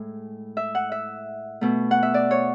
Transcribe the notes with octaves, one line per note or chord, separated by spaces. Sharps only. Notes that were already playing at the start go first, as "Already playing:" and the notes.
Already playing: A2 G#3
E5
F#5
E5
B2 A3
F#5
E5
D5
C#5